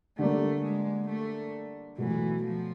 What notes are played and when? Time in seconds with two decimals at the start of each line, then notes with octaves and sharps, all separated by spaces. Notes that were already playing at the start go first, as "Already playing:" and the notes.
0.18 D3 G3 A3 A#3
0.63 G#3
1.08 A3
1.98 B2 E3 F#3 A3
2.43 F3